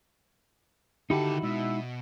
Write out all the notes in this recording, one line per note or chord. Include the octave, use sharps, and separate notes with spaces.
D3 D#3 D#4 E4 F#4 G4 A5
B2 G#3 E5